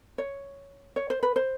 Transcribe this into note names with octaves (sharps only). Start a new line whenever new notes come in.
C#5
C#5
C5
B4
C5